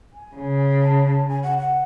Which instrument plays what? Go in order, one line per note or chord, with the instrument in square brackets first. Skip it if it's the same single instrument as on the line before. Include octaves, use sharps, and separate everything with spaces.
[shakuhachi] G#5
[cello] C#3
[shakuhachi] A5
A5
G#5
F#5
F#5